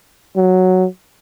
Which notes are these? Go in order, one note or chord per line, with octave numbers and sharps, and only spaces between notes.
F#3